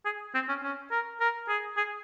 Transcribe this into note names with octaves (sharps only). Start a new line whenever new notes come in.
G#4
C4
C#4
C#4
A#4
A#4
G#4
G#4